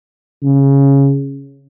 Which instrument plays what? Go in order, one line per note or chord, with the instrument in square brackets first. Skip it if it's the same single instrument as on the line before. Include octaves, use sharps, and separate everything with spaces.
[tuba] C#3